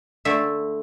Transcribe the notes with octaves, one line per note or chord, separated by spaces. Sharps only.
D3 A3 E5